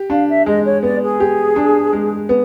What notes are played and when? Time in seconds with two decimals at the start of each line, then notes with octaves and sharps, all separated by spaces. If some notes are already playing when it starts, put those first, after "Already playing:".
Already playing: G4
0.10 D4 F5
0.28 E5
0.46 G#3 D#5
0.65 C#5
0.83 B3 D5
1.02 G#4
1.20 G4
1.56 D4
1.93 G#3
2.29 B3